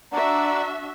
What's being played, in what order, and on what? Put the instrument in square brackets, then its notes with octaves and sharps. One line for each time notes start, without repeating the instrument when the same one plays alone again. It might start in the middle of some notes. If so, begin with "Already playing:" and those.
[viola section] D4 F#4 E5 [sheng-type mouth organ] D5 F#5 [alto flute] A#5